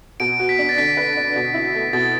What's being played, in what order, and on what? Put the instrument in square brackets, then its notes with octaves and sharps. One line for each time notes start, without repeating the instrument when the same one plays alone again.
[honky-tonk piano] B2 [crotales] D7
[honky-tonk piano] F#4
[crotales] B6
[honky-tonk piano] D4
[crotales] A6
[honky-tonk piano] D3 [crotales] B6
[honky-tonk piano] B4
D4
B2
E4
A3
[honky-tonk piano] B2 [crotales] A6